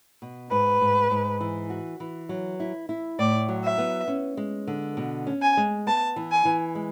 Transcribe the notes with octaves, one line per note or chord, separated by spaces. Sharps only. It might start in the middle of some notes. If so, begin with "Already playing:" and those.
B2
G#2 B4
G#2
G#2
E3
F#4
E3
F#3
E4
E4
A2 D5
F#3
E5
B3
C#4
G#3
D3
B2
C#4
G#5
G#3
B3 A5
E3
G#5
E3
G#3